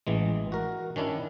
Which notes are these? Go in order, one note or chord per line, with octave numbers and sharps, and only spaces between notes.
A1 E3 G#3
F#4 A#4
D#3 C#4 D4 E4